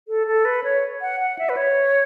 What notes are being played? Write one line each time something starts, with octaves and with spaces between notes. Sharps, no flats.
A4
A4
B4
C#5
F#5
F#5
E5
B4
C#5